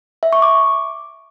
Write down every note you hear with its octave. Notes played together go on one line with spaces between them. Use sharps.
E5
C#6
D6